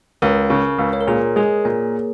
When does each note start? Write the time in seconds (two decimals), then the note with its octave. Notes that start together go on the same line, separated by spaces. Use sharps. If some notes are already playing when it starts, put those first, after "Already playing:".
0.22 C#2 A#4
0.50 C#3
0.78 C#2
0.93 C#5
1.00 A#4
1.07 A#2 G#4
1.36 G#3 G#4
1.65 A#2 A#3